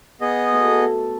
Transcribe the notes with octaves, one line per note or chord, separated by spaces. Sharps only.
B3 G#4 D#5
B2 A3 A4